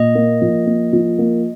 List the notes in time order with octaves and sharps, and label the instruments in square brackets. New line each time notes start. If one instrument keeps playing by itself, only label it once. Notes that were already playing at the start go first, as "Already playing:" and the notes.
Already playing: [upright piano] A#2 [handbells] D#5
[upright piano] A#3
F3
A#3
F3
A#3